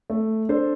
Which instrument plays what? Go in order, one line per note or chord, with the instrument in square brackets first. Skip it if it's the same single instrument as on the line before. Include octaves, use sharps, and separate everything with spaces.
[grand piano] A3
D4 A4 C5